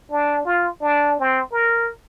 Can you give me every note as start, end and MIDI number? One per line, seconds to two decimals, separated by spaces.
0.10 0.42 62
0.45 0.68 65
0.81 1.19 62
1.20 1.41 60
1.52 1.90 70